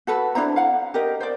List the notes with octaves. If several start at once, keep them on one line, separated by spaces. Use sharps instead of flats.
F#4 A4 B4
D4 E4 C5 A#5
F5 F#5
G4 A#4 D#5
C5 D5